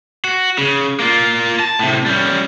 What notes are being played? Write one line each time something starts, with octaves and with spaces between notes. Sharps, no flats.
F#4
C#3
A#3 F4
A5
A2 C3
G3 C#4